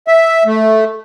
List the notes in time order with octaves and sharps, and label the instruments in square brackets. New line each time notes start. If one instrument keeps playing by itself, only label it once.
[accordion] E5
A3